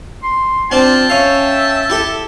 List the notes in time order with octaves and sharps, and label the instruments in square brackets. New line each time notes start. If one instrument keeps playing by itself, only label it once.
[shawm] C6
[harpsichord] C4 D4 [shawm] F4 [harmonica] G5 A5
[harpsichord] C#4 F5 [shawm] E5
[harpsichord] E4 G4 A4